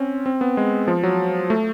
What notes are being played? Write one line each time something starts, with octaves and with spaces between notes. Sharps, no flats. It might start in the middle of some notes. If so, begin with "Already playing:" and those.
Already playing: C4 C#4
C4
B3
G#3
F3
F#3
A3